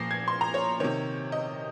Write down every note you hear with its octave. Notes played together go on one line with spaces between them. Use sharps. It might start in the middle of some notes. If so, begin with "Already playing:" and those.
Already playing: A#2 F3 A#6 C7
G#6
C6
A#5
C#5
C3 D#3 C#5
D#5